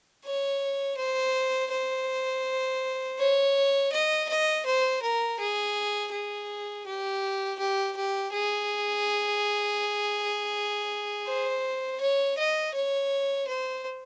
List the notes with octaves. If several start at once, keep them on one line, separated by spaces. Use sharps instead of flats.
C#5
C5
C5
C#5
D#5
D#5
C5
A#4
G#4
G#4
G4
G4
G4
G#4
C5
C#5
D#5
C#5
C5